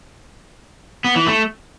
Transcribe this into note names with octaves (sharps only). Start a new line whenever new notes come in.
B3
E3
A3